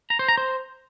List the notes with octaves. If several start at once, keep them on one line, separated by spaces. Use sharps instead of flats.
A#5
C5
A#5
C5